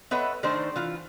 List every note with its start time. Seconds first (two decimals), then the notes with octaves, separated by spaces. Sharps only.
0.11 B3 A4 B4 C#5 D#5 E5
0.43 D#3 A3 D4 D#4 C5
0.76 E3 F4